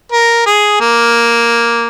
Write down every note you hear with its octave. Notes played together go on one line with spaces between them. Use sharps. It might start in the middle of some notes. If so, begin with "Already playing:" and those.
A#4
G#4
A#3